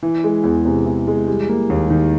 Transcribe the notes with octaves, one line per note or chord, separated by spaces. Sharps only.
E3
G#3
E2
C3
E3
G#3
G3
A#3
D#2
D#3